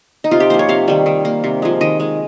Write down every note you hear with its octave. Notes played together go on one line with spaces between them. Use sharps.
D#4
C3 F4
G4
F3 A#3 C5
C#5
C3 F5
D#3 G3
D#3
A#3
C3
F3 G#3
D#3 D#5
G#3